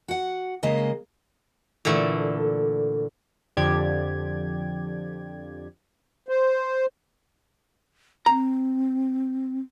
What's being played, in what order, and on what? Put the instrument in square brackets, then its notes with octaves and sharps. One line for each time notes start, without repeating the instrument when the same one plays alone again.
[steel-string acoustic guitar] F#4 F#5
C#3 G#3 A#3 D#5
[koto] A#2 D3 E3 A3
[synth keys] F2 D3 F3 G4 D5 G#6
[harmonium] C5
[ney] C4 [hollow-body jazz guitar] A#5